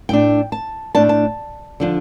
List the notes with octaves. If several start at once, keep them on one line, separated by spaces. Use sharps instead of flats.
A2 A3 D4 G5
A5
A2 A3 D4 A5
A5
D3 F3 D4